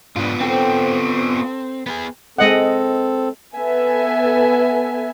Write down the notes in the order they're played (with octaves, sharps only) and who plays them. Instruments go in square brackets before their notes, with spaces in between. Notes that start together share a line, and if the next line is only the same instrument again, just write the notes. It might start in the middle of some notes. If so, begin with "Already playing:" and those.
[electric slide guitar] G#2 D4 [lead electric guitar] B3 F4
[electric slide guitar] C4 [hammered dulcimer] A4 C5 G5
[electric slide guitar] B3 G4 G#4
[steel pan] G#3 D#5 F#5 [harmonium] C4 A4
[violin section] B3 A4 E5 G#5